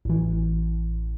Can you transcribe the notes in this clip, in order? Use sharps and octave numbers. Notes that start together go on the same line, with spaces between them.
A1 E3